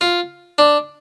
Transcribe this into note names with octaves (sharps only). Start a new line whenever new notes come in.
F4
D4